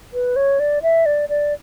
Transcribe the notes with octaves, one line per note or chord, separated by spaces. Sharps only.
B4
C#5
D5
E5
D5
D5